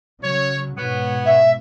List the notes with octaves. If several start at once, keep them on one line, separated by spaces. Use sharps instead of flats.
C#3 F#3 C#5
G#2 B2 B3 C#5
E5